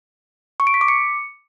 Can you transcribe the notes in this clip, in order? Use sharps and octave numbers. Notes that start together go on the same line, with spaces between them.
C#6
D7
B6
D6
C#7